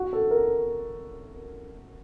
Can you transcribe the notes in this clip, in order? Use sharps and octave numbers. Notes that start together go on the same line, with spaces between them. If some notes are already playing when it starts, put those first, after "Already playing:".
Already playing: F#4
A4
A#4